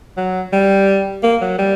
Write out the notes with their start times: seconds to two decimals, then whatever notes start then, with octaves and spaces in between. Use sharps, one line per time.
0.18 F#3
0.53 G3
1.23 A#3
1.41 F#3
1.58 G3